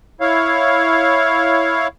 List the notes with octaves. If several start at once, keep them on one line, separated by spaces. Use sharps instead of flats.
E4 C#5 F5